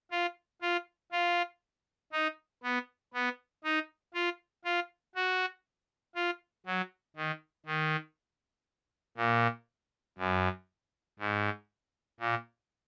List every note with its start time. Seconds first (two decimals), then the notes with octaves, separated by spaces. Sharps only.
0.11 F4
0.62 F4
1.12 F4
2.12 D#4
2.63 B3
3.14 B3
3.64 D#4
4.14 F4
4.65 F4
5.15 F#4
6.15 F4
6.66 F#3
7.16 D#3
7.66 D#3
9.17 A#2
10.18 F#2
11.20 G#2
12.20 A#2